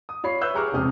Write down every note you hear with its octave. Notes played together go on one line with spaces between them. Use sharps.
D#6
F4 C#5 B5 C7
B4 C#5 E5 E6 F#6 G6
G4 G#4 A#5 C#6 D6 F6
E1 A1 F2 C3 D#6 F6